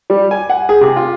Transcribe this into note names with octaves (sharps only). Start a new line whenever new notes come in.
G3
G#5
F#5
G#4
C3
F4